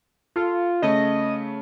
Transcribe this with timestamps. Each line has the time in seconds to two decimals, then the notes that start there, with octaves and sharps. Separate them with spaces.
0.36 F4 A4
0.82 C#3 A3 D#5